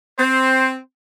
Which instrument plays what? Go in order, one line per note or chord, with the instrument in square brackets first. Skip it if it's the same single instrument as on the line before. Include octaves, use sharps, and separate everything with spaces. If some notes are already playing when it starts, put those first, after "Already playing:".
[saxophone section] C4 [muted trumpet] C5